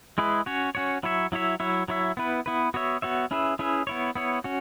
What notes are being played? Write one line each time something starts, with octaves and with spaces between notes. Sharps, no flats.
G#3 E4 G#4 B4
C#4 F#4 C#5
C#4 F#4 C#5
F#3 E4 C#5 E5
F#3 E4 C#5 E5
F#3 E4 C#5 E5
F#3 E4 C#5 E5
B3 E4 B4
B3 E4 B4
B3 F#4 C#5 E5
B3 F#4 C#5 E5
C#4 E4 G#4 B4 E5
C#4 E4 G#4 B4 E5
B3 E4 C#5
B3 E4 C#5
C#4 F#4